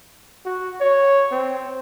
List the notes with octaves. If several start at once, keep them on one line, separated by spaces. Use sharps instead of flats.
F#4
C#5
C4